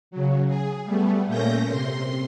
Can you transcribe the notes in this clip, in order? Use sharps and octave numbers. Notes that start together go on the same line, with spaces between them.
C#3 F#3
G#4
G3 A3 B3
A#2 A3 A#3 C#4 G6 A#6
C3 C6